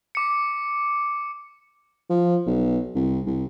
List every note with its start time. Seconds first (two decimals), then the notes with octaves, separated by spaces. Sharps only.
0.15 D6 C#7
2.10 F3
2.46 B1
2.95 C2
3.27 C2